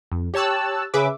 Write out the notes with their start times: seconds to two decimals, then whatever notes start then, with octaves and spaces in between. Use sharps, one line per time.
0.12 F2
0.34 G4 C#5 A5 E6 F#6
0.94 C#3 G#4 B4 E5 D6